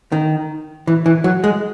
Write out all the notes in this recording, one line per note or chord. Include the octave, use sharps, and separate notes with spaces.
D#3
E3
E3
F#3
G#3